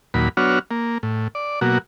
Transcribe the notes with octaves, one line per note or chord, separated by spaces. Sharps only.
D#2 A#2 F#3 B5
F#3 B3 D4 F#4 C#5 F6
A#3
A2
D5
B2 F#3 A#3 F#4